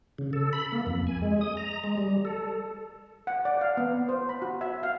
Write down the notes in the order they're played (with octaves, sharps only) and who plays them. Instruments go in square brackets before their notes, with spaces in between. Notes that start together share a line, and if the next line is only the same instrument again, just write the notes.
[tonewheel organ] C#3
A4
B5
A#3
F2
G#5
G#3
D#6
A#5
G#3
G3
A4
[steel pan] F#5
D5
F5
B3
C5
B5
F#4
E5
F5